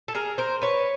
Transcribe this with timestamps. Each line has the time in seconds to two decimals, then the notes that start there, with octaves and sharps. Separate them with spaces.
0.08 A4
0.15 G#4 A#4
0.38 A#4 C5
0.62 B4 C#5